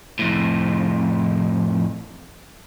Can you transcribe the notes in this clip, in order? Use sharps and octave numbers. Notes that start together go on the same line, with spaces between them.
F2 A2